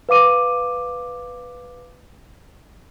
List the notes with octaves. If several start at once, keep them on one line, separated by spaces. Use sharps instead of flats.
B4 F5 D6 D#7